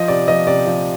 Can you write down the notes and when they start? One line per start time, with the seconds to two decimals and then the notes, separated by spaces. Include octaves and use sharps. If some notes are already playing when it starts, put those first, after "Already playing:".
Already playing: F3 D#5
0.08 C3 D5
0.28 F3 D#5
0.47 C3 D5
0.67 F3